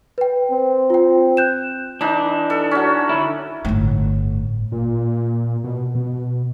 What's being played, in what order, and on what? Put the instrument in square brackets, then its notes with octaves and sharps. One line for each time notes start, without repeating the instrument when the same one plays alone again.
[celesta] B4 G5
[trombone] C4
[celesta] F4 G5
F#6 G6 E7
[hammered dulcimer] E3 D#4 [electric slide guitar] D4
[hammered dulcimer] A4
C#4 F#4
[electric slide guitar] D3 E4
[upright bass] G1 A2
[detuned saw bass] A#2
B2
B2